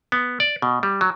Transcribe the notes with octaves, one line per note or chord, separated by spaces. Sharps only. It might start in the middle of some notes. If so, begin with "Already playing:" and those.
B3
D5
B2
G3
F#3